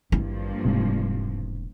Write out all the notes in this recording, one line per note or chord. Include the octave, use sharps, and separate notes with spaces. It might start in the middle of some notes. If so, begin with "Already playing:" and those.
G#1 G2 F3 A#3 E4
E1 G#2 C3